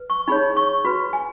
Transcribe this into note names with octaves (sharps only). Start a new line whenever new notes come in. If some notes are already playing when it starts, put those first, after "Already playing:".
Already playing: B4
C#6
D#4 G#4 C#5 B5
C#6
F#4 B4 B5
G#5